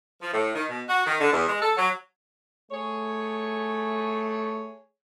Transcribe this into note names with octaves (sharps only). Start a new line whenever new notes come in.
F3
A2
D#3
B2
F#4
D#3
D3
E2
G#3
A4
F#3
A3 G#4 C#5